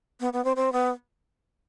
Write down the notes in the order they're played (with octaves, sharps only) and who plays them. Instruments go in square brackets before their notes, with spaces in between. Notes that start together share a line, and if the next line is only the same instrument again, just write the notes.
[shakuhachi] B3
B3
C4
C4
B3